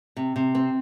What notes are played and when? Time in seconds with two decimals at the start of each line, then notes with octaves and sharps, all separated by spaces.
0.17 C3
0.36 C3
0.55 C4